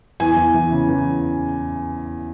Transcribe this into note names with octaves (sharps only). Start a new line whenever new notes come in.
E2 G#5
E2
E3
C#3
E2